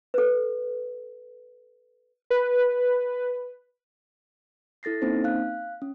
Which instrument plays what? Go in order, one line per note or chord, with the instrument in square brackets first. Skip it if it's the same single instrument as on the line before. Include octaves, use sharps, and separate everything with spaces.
[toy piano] A4 B4
[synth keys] B4
[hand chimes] E4 A4 A6 A#6 C7
A#3 C4 C#4 D#4 C5
F5 F#6
C#4